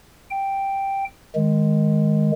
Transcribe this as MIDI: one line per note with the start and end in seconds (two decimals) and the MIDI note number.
0.31 1.05 79
1.35 2.32 51
1.35 2.32 56